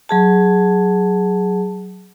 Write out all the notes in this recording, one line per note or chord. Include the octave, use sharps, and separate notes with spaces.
F#3 G#4 A5